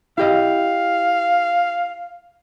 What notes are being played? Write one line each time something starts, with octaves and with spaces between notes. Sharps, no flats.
E4 G4 D#5 F5